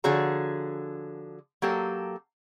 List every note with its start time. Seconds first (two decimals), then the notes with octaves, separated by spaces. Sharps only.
0.04 D3 F3 F#4 G#4 C#5 A#5
1.62 F#3 A#3 G4 A4